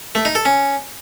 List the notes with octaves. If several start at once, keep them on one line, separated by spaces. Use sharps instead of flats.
A3
D#4
A4
C#4